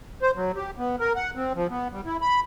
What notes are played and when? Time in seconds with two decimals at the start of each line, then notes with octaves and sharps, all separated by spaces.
0.22 C5
0.35 F#3
0.55 G4
0.78 B3
1.00 A#4
1.16 F#5
1.35 C4
1.55 F3
1.70 B3
1.92 G3
2.05 E4
2.21 B5